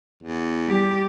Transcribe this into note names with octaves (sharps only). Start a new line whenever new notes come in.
E2
G3 G4